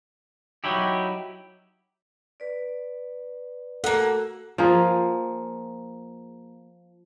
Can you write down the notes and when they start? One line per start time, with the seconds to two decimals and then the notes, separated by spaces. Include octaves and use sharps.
0.64 F#3 D#4 E4 G4
2.40 B4 D5
3.84 A#3 F#4 A4 F#5
4.58 F3 A#3 G#4